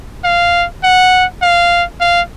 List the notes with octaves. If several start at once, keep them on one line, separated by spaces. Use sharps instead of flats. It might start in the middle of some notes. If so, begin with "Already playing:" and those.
F5
F#5
F5
F5